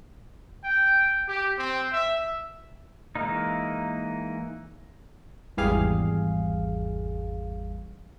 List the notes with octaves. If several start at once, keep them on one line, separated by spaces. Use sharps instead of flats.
G5
G4
C4
E5
E3 G#3 A#3 D#4
G#1 E2 G3 G#4 F5